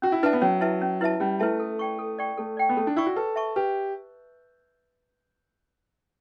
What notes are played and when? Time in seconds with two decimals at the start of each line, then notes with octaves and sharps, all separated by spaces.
0.02 C#4 F#4
0.12 E4
0.23 D4 E4 B4 E5 A5
0.33 B3
0.41 F#3 C#4
0.61 E4 B4 E5 A5
0.82 C#4
1.01 E4 B4 E5 A5
1.20 G3 C#4
1.40 A3 E4 B4 E5 A5
1.60 A4
1.79 D5 G5 C#6
1.99 A4
2.19 D5 G5 C#6
2.38 A3 A4
2.57 D5 G5 C#6
2.69 B3
2.77 A3 A4
2.87 D4
2.97 E4 D5 G5 C#6
3.06 F#4
3.16 A4 B4
3.36 E5 A5 C#6
3.56 G4 B4